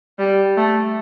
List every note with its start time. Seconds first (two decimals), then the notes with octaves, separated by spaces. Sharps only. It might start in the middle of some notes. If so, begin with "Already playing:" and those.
0.19 G3
0.57 A3